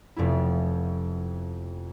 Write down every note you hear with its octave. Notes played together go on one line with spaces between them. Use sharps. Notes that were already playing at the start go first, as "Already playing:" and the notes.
F1 F2 B3 E4